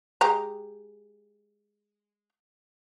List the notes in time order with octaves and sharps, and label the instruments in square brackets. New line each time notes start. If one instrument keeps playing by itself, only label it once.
[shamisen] G#3 G4 A#5